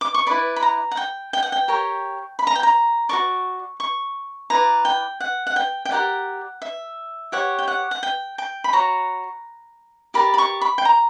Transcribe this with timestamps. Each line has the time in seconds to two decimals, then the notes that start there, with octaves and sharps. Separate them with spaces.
0.01 D6
0.14 C#6
0.27 E4 B4 D5 B5
0.56 B5
0.63 A#5
0.91 F#5
0.97 G5
1.33 G5
1.43 F#5
1.52 G5
1.68 G4 A#4 C#5
2.39 B5
2.47 A#5
2.55 G5
2.63 A#5
3.09 F#4 A#4 D5 C#6
3.80 C#6
4.50 E4 B4 D5 A#5
4.85 G5
5.20 F#5
5.47 F#5
5.56 G5
5.85 G5
5.91 G4 A#4 D5 F#5
6.62 E5
7.32 G4 C#5 F#5
7.59 G5
7.68 F#5
7.91 F#5
8.03 G5
8.38 G5
8.64 B5
8.73 F#4 C#5 A#5
10.14 G4 A#4 D5 B5
10.34 B5
10.38 C#6
10.61 B5
10.78 G5
10.85 A#5